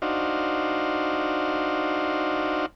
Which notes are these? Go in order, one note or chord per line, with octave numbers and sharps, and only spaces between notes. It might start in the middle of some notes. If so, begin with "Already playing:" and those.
D4 D#4 F#4 C5 F5